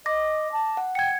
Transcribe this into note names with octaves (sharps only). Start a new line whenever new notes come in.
D#5 D6 A#6
A5
F#5
G5 G#6 C#7